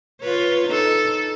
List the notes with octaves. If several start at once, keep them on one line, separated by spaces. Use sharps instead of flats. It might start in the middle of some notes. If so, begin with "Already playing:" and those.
F4 B4 C#5
D#4 A4